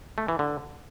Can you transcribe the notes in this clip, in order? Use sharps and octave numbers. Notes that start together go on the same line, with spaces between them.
A3
E3
D3